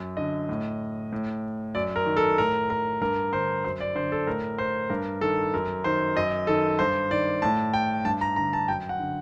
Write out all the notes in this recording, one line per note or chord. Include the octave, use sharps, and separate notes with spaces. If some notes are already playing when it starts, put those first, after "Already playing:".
Already playing: F#2
D3 D#5
A2
A2
F#2 D5
A#4
D#3
A4
A2 A#4
A#4
G2 A#4
D3 C5
F#2 C5
D5
D3 C5
A4
A2 A#4
C5
G2 A#4
D#3 A4
F#2 A#4
D#3 C5
F#2 D#5
D#3 A4
G2 C5
D#3 D5
A2 A5
G5
G2 A5
A#5
D3 A#5
A5
F#2 G5
F#5
D3